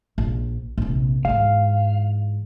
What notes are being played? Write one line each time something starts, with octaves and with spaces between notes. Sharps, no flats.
A#1
A#1 C3
G#2 E3 F5